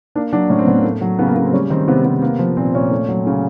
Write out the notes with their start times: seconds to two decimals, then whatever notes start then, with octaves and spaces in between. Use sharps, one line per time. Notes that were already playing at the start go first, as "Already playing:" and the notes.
0.15 A#3 D4
0.33 F#3 D4
0.50 A2 C#4
0.59 C4
0.67 A2 B3
0.76 A#3
0.84 A3
1.01 F#3
1.19 C#3 B3
1.27 A#3
1.36 C#3 B3
1.45 C4
1.53 G3 C#4
1.70 D#3 C4
1.88 C3 B3
2.05 C3 B3
2.22 A#3 B3
2.39 F3
2.57 A#2 C4
2.75 A#2 C#4
2.91 A3
3.08 F#3
3.27 C#3